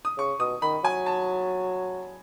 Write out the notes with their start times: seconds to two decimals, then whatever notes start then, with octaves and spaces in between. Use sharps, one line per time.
0.05 D#6
0.18 C#3 C#6
0.40 B2 D#6
0.62 D#3 B5
0.84 F#3 G#5
1.06 A5